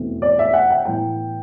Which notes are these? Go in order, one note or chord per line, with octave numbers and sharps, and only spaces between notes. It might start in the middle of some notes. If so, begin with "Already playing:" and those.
Already playing: E2 B2 A3 C4
D5
E5
F#5
G5
A2 E3 B3 G5